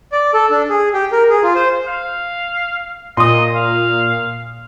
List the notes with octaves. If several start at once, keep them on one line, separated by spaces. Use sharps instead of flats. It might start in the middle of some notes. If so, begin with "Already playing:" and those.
D5
A4
D4
G#4
G4
A#4
G#4
F4
C5
F5
A#2 D#5 C6 D#6
F5